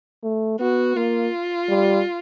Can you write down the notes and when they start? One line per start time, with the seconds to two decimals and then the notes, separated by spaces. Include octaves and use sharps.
0.23 A3
0.60 B3 F#4
0.96 A#3 F4
1.69 G3